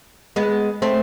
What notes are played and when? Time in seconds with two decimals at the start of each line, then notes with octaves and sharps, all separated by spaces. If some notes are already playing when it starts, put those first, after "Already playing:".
0.36 G#3 B3
0.82 A3 C4